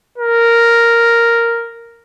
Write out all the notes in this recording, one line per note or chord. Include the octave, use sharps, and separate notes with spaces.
A#4